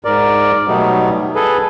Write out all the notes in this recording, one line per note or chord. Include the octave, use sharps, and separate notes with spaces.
G#2 A#4 D5
B2 F#3 G3 A3 B3 D#4
G#4 A4 B4